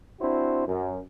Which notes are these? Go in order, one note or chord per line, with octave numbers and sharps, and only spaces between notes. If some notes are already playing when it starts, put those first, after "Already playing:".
C4 D4 E4 F#4 C5
F#2